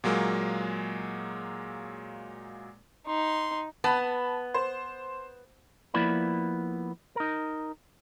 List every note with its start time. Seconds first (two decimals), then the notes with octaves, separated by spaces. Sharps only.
0.04 A#2 F#3 G#3 A#3
3.07 D#4 C6
3.84 B3 A5 B5
4.54 C5
5.94 F3 A#3 B3 E4 D5 B5
7.16 D#4 A#4